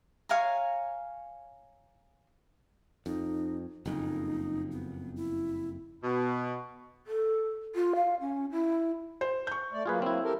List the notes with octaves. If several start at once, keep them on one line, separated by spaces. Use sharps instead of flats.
C#5 F5 G#5 A#5
F2 D#4
F#1 F2 D#4
B3
E4
B2
A4
F4
F5
C#4
E4
C5
C#6 G6
A3 D5
F#3 A#3 F4 G#4 B4
C4 E4
G4 A4 A#4